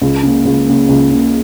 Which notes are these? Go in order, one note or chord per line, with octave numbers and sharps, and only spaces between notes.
C#2
C#3 A#3
C#2
C#3 A#3
C#2
C#3 A#3